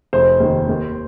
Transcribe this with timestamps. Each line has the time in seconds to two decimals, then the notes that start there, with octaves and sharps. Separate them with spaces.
0.13 F1 C5
0.40 D#2 D#3
0.69 D#2